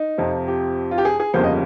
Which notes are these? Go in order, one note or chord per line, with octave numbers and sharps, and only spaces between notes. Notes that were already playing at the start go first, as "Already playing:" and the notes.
Already playing: D#4
F2 C3 F3
G4
F4
G4
G#4
G#4
G1 F2 C#3 G3 A#3 C5
D#5